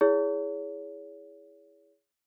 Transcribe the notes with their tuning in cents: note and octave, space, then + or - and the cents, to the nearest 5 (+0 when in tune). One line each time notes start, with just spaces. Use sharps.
E4 +0 G#4 +0 C#5 +35